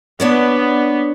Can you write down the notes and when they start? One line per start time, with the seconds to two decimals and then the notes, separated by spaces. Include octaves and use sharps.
0.20 B3 D4 C#5 D5